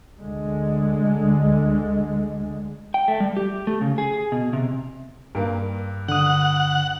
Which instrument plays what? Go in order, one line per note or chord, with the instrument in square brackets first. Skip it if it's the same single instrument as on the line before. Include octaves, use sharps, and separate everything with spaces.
[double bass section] D2 D3 G#3
[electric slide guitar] G5
A3
G3
G4
A3
C#3
G#4
B2
C3
[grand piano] G2 A#3
[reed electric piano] D3 D#6 [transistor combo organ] F#5